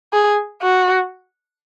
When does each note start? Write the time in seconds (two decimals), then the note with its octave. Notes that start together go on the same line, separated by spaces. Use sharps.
0.13 G#4
0.62 F#4